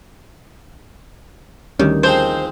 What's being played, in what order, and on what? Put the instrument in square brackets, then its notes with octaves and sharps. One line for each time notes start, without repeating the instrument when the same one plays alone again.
[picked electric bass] D2 G3 C#4 [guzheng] D#3
[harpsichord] F3 G#3 C4 [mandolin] C5